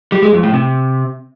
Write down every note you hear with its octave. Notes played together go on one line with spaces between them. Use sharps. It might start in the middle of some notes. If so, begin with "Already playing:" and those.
G3
G#3
F2
A2
C3